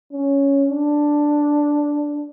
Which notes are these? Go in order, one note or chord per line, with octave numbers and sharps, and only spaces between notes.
C#4
D4